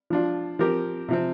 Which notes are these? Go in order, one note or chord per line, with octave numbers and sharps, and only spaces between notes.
F3 D4 F4
F3 C4 G4 A#4
C3 F3 C4